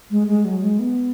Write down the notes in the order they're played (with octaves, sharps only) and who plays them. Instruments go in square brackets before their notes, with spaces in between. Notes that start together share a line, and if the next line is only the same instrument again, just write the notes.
[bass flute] G#3
G#3
F#3
G#3
B3